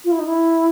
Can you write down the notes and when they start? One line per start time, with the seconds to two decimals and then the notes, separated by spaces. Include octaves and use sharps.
0.04 F4
0.11 E4
0.19 D#4
0.26 E4